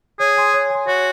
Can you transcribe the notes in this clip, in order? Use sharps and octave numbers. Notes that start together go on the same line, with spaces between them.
G#4 C#5
G#5 C6
C#5
G#5 C6
F#4 C#5